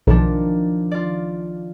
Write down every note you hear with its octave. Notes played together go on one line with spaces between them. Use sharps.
B1 D#3 F3 D4
F4 D5